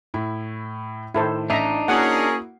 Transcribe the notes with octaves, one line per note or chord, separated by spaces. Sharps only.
A2 E4
A2 D#3 E4 A4 C5
A1 D4 D#4 D#5 E5 A#5 C7
A#3 C#4 E4 F#4 G#4 A#4 F#5